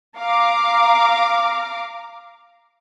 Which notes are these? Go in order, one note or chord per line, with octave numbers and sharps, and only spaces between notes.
F5 A#5 D6